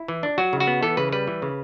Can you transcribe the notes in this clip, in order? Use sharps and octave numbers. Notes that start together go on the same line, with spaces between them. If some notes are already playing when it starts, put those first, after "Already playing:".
Already playing: E4
E3
D4
F#3 F#4
C#3
F#4
B3
E3 A4
C#3 B4
G3 B4
E3
C#3